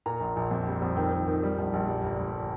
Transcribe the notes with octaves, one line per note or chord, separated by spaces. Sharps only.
A#2 A#5
A#1
A#1
F2
G3
F2
D#3 G5
D#3
D#3
G3
A#1
A#1
G3
G1
G1